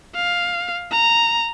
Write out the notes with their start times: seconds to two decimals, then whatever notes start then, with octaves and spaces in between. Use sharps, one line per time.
0.15 F5
0.91 A#5